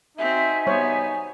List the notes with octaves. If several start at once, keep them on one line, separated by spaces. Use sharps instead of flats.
C4 D#4 F#4 E5 G#5
G3 B3 C5 C#5